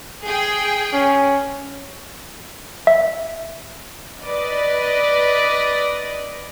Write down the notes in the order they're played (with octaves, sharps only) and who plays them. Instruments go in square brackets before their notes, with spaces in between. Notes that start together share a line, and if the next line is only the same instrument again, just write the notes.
[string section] G#4 G5
[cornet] C#4
[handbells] E5
[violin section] B4 D5 D#5